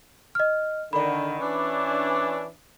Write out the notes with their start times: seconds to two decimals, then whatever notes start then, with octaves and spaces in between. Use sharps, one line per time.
0.35 D#5 F6
0.93 D3 D#3 D5 B5
1.40 E3 C#4 D4